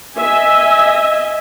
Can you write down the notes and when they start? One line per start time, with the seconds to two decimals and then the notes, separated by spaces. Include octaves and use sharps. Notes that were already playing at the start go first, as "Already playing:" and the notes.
0.16 D#5 E5 G#5